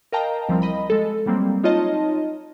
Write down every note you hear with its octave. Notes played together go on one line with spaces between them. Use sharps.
A#4 D#5 F5 G5 A5 A#5
C2 F3 G3 C4
D#5 B5
G#3 A4
F#3 G3 A#3 C4
D#4 F4 C#5 D#5 A5